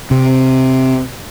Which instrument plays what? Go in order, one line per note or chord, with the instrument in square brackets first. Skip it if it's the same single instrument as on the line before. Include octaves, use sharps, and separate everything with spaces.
[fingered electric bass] C3